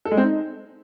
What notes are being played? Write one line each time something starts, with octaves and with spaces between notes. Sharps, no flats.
A4
G#3
C4
D#4